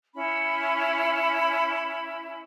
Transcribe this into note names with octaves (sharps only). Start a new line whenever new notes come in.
C#4 E4 B5